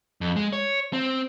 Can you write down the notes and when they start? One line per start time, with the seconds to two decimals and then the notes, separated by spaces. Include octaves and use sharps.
0.21 F2
0.36 G#3
0.53 C#5
0.93 C4